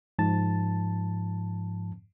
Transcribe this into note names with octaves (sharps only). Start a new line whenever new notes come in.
G#2 F3 A5 A6